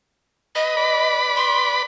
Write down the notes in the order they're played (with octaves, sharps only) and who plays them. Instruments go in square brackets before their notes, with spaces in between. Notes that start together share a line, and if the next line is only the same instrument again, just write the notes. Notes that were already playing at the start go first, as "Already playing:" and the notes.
[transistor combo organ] B4 D#6 [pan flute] D#5
[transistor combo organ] B4 D5 B5
[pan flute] C6